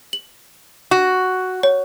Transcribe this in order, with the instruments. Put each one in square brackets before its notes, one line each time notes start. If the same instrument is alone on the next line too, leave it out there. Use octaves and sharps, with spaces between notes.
[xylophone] F#7
[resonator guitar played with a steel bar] F#4
[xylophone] C#5